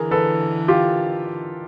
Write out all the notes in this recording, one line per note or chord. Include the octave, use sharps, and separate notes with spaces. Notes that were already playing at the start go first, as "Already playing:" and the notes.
Already playing: D3 E3 G#4 A#4
A4 B4
F4 G4